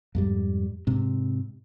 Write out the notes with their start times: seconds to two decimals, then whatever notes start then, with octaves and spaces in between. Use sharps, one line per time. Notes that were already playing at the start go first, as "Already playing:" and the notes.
0.15 F2 G#2 G3
0.87 G#2 C3